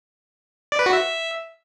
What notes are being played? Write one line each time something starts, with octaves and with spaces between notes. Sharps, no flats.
D5
B4
F#4
E5